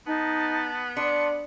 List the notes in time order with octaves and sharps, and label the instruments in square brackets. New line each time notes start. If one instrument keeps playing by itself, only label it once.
[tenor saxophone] B3 [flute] D#4 [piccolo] A5
[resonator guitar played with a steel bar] D4 [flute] C6 [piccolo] C#7